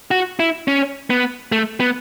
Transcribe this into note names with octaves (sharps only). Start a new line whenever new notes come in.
F#4
E4
C#4
B3
A3
B3